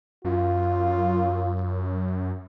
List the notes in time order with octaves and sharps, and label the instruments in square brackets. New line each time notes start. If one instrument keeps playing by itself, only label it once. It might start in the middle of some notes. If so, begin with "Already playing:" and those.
[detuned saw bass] F#2 [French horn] F4